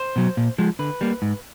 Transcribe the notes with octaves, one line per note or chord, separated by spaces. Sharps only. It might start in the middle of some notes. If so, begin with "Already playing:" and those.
Already playing: C5
B2 F#3
A#2
F3 G#3
D3 B4
G3 A#3
G#2